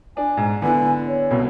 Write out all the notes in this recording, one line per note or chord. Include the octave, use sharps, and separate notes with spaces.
D4 G#5
G#2
D3 B3 E4 G#5
C#5
C2 B2